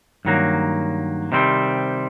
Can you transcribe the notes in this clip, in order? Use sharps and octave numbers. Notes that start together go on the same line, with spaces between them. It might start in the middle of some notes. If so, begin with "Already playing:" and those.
G2 D#3 F#3 A#3
C3 D#3 G3 C4